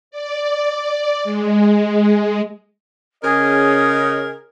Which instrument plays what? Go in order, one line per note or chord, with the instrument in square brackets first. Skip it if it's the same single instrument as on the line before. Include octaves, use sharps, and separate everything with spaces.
[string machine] D5
G#3
[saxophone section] C#3 C#4 [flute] G#4 [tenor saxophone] A#4 [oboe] D#5